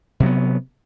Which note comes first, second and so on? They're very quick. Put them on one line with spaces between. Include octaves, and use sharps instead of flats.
C3 F#3 B3